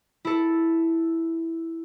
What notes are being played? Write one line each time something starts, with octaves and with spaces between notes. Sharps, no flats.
E4 A4